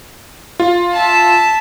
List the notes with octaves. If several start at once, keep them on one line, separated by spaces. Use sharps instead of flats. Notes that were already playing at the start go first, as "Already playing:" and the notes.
F4
E5 A5